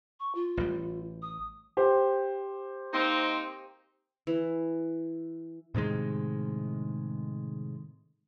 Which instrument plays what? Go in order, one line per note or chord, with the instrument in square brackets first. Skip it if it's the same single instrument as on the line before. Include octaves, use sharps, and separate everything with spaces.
[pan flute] C#6
F4
[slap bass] A1 G3
[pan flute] D#6
[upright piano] G4 C5
[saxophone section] A#3 C4 D#4
[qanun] E3
[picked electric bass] A2 C3 D#3 G#3